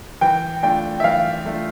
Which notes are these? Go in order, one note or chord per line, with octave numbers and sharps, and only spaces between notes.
E3 G5
A3 D4 F4 G5
E5
E3 F5
A3 D4 F4